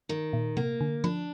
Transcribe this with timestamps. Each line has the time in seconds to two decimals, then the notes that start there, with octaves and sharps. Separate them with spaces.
0.09 D#3
0.33 A#2
0.57 C3 A#3
0.81 D3
1.04 F3 D4